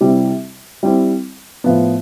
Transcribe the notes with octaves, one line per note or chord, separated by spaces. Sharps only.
C3 G3 C4 E4 G4
G3 C4 E4
A2 F3 B3